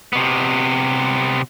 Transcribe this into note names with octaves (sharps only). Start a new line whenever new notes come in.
C3 B3